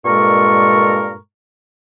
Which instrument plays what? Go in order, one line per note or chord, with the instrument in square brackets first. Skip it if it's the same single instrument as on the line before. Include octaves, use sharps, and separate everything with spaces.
[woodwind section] G2 A#2 G#3 A4 A#4 C#6